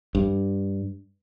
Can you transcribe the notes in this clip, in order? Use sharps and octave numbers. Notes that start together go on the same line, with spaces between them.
G2